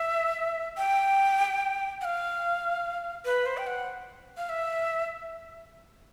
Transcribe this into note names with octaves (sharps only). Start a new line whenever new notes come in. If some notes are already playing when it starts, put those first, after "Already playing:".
Already playing: E5
G5
F#5
F5
B4
C5
G5
F#5
F5
E5